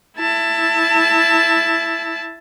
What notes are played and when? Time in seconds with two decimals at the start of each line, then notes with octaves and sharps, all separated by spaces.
0.18 E4 A5